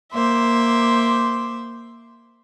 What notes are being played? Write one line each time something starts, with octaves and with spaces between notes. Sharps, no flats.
A#3 C5 E5 D6